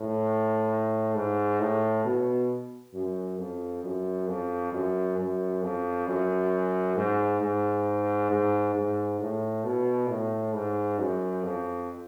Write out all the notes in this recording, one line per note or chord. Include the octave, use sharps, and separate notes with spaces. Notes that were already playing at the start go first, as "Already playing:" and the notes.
Already playing: A2
G#2
A2
B2
F#2
F2
F#2
F2
F#2
F#2
F2
F#2
G#2
G#2
G#2
G#2
A2
B2
A2
G#2
F#2
F2